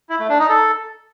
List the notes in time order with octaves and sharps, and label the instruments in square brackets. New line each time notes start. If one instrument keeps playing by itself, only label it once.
[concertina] E4
A3
D4
D#4
A4